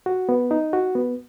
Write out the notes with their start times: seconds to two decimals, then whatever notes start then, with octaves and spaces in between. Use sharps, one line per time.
0.06 F#4
0.29 B3
0.51 D#4
0.73 F#4
0.95 B3